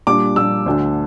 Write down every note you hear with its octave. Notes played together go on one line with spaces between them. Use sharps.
A#2 G3 D4 D6
A#2 G3 D4 E6
D2 D3 A3 D4